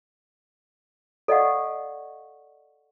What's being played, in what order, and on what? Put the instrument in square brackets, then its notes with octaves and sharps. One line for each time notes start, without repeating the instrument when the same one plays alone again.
[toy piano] A4 D5 D#5 F5 F#5 C#6